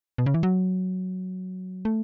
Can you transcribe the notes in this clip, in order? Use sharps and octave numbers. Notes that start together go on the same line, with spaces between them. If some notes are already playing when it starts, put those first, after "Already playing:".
B2
C#3
E3
F#3
A3